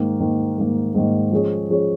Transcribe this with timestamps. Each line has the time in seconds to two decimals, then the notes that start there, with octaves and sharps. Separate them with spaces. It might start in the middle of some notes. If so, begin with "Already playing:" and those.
Already playing: G#2 D#3 A#3
0.20 G#2 D#3 A#3
0.58 G#2 D#3 A#3
0.95 G#2 D#3 A#3
1.32 F3 G#3 C#4 G#4 C#5
1.70 F3 G#3 C#4 G#4 C#5